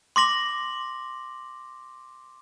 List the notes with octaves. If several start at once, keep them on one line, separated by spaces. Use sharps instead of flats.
C6 D6 A#6 F#7